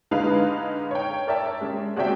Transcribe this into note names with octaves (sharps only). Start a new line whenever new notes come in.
D3 G#3 D#4 B4 F5
C#5 G5
A#4 D5 E5 A5
G#3 C#4
G#3 C4 F#4 D5 E5 G5